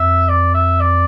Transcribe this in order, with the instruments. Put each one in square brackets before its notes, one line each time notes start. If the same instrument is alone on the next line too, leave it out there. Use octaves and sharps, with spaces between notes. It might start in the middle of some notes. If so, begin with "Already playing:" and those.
Already playing: [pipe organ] F2 [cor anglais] E5
[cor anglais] D5
E5
D5